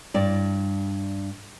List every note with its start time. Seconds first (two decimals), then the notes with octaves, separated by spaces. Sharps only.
0.14 G2 D5